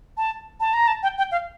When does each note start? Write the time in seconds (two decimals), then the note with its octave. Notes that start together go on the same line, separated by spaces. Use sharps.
0.17 A5
0.60 A5
0.73 A#5
0.87 A5
1.03 G5
1.18 G5
1.32 F5